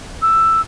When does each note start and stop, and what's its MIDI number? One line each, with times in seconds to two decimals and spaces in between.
0.22 0.61 88